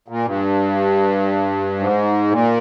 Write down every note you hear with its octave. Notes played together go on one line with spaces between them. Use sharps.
A#2
G2
G#2
A#2